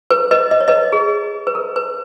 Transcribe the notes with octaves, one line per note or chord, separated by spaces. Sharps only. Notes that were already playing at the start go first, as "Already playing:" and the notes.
B4
B4 D#5
D#5
C#5
B4 D#5
G#4
B4
A#4
B4